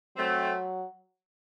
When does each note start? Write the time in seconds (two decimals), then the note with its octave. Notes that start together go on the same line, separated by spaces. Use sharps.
0.16 F#3 A3 C4